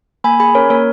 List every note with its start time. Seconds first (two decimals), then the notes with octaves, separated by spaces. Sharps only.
0.24 A#3 G#5 B5
0.40 G#4 G#5 B5
0.55 C#4 A#4 C#5
0.70 A#3 A#4 C#5